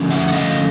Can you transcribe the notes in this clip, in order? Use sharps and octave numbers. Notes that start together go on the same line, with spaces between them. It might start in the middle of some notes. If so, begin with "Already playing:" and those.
Already playing: D3 F3 A3 C#4
E5 F#5
F#5
D#5 F5